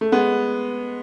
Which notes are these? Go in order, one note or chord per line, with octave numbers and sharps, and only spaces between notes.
A3
G#3 B3